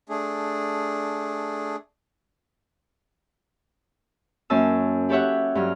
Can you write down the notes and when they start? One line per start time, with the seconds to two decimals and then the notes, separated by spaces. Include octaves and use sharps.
0.09 A3 D4 G#4
4.50 F#2 A#3 C#4 A5 E6
5.09 E4 G4 A4 C#5 E5 F#5
5.55 G2 F#3 F6